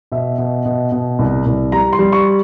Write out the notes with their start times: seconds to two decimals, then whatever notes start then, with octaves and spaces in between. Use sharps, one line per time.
0.12 B2 E5
0.38 B2
0.66 B2
0.92 B2
1.19 C2
1.46 C2
1.72 G3 A#5
1.93 C6
1.99 G3
2.12 C#6